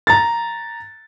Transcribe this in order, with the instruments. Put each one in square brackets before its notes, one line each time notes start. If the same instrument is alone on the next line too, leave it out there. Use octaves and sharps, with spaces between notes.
[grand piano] A#5 A6